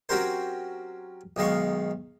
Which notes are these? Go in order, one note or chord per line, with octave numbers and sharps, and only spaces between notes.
F#3 C4 C#4 G4 A#4 C5
B1 D#3 G#3 F5 C#6